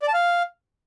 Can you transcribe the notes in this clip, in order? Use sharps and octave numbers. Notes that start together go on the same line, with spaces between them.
D5
A5
F5